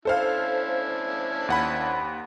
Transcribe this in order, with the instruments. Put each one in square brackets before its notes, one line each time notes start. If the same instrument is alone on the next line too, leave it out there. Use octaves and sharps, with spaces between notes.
[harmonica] C#4 D4 E4 [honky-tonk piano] A4 C5 F5
[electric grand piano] D#2 F#5 B5